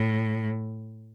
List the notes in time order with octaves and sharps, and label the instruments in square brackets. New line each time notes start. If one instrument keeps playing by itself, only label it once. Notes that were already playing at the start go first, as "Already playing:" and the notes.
Already playing: [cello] A2